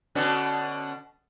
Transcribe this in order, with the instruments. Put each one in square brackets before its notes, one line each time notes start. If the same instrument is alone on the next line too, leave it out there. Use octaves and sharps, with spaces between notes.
[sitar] B2 D3 C#4